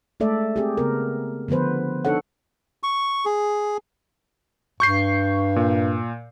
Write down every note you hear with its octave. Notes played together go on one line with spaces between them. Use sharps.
G#3 A3 A4 D5 E5
C4 G4 G#4
C#3 B3 A#4
D3 F3 B3 B4 C5
D4 D#4 A4 C#5 F#5
C#6
G#4
G2 C#6 G6 C7
A#2